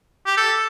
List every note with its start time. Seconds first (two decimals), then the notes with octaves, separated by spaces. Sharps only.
0.26 G4
0.37 A4